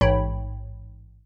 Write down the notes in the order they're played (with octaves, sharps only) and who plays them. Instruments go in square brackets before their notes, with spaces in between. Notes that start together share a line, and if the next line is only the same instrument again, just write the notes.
[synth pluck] A1 G#2 C#5 G5 B5